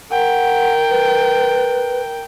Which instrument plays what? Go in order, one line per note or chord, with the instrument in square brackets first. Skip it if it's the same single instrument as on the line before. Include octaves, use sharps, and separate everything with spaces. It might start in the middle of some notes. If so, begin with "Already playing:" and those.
[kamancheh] A#4 G5 [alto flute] F#5
[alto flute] B4